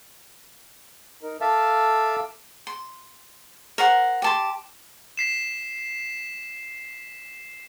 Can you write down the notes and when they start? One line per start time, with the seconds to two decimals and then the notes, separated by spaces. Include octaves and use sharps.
1.23 D#4 A#4
1.41 A4 E5 F5 A5 D6 E6
2.67 C6
3.78 A#4 C5 F#5
4.22 G4 A5 C6
5.17 B6 C7 E7